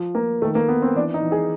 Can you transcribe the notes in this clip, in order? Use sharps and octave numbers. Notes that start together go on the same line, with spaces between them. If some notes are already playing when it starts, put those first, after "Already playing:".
Already playing: F3
F3 A#3
D#3 A3
A#3
D#3 B3
C4
E3 D4
D#4
E3
G#4